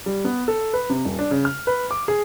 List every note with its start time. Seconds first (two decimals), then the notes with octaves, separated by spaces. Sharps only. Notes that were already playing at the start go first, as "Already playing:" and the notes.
0.06 G3
0.25 B3
0.48 A4
0.73 B4
0.90 C3
1.05 D#1
1.19 D4
1.31 C#3
1.45 F6
1.67 B4
1.91 D6
2.08 G#4